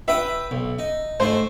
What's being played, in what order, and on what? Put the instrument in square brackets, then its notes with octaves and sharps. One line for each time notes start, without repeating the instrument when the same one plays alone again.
[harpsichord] B4 G5 D#6 [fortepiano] E5
[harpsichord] B1
D#4
[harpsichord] G#2 A3 D#4 [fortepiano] C5